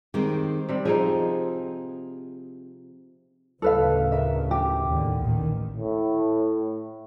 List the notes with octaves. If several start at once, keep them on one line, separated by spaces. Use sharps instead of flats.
D#3 G#3 C4 G4 C5
C3 G3 C4
F3 C4 D#4 G#4
D2 A2 C#3 A4 B4 F5
A#4 E5
G4
D#2 A2 D3
A1 A#2 D#3
A2